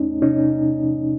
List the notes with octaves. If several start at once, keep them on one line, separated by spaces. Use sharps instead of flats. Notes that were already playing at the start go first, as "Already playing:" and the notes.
Already playing: E2 A3 C#4 D#4
C3 C#4 D#4